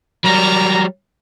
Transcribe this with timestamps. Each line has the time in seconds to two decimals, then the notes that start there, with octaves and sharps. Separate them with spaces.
0.24 F#3 G3 A#4 A#5